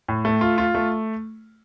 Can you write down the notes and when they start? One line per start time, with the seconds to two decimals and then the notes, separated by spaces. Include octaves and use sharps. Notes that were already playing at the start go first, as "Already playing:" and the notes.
0.09 A2
0.25 A3
0.41 F4
0.58 F4
0.75 A3